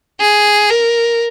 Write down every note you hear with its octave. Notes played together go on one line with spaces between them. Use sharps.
G#4
A#4